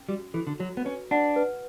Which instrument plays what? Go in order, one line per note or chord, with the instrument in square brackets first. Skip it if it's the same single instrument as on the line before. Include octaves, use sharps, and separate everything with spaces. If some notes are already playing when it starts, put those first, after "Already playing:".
Already playing: [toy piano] C#4
[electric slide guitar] G3 [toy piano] F#4
[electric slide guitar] E3 [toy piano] A4
[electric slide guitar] D3
[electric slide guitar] F#3 [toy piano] F#4
[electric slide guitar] B3
[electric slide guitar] C#4 [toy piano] B4
[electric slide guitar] D4 [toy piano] F#5
[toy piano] B4